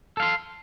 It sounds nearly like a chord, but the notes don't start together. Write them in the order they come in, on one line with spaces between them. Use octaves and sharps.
A4 F5 C6